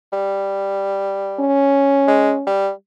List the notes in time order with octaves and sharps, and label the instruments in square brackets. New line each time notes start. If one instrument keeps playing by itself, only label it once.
[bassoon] G3
[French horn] C#4
[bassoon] G#3
G3